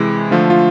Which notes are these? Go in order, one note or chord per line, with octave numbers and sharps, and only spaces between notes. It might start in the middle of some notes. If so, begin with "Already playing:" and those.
Already playing: C3 E3 G#3 E4
D3 F3 A3 F4
F4